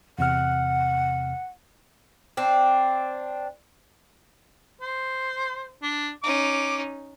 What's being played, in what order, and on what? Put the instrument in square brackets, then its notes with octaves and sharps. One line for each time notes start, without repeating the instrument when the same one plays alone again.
[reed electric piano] E2 C3 F6 [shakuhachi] F#5
[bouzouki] C4 D4
[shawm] C5
D4
[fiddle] C#4 D#4 [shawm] D6